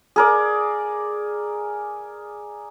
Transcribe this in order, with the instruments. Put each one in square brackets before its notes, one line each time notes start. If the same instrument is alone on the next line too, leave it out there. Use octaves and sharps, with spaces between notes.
[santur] G#4 A#4 D5